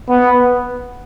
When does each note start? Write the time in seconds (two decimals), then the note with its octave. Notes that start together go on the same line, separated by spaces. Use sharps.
0.09 B3